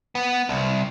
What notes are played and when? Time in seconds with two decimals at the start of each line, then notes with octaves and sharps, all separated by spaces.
0.15 B3
0.49 C2